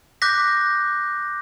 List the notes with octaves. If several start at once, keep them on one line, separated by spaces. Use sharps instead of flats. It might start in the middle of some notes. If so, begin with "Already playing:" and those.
D6 F#6 G6 A#6 B6